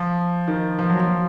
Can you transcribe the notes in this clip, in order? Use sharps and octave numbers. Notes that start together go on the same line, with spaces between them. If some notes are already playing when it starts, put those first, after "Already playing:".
Already playing: F3
D#3
F3
F#3
F3